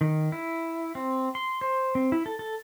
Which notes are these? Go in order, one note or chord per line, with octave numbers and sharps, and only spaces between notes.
D#3
E4
C4
C6
C5
C4
E4
A4
A4